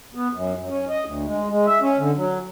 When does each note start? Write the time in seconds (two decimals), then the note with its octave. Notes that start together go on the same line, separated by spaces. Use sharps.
0.15 B3
0.33 F#2
0.58 F#2
0.69 C#4
0.89 D#5
1.05 D2
1.26 G#3
1.49 G#3
1.67 E5
1.81 C#4
1.98 D3
2.16 F#3